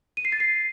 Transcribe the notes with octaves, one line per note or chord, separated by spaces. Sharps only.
D#7
C7
A6
C7